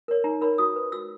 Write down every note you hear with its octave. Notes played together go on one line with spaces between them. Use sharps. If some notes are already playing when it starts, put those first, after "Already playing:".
A#4 C#5
D#4 A#5
A#4 C#5 B5
F#4 D#6
B4
F#4 E6